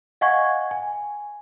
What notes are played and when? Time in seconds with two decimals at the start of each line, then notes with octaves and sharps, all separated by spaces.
0.21 D#5 F5 F#5 G#5 C#6 G#6
0.71 G#5